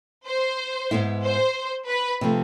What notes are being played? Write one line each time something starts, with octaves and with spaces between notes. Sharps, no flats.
C5
G#2 G#3 B3 E4
C5
B4
C3 F3 A3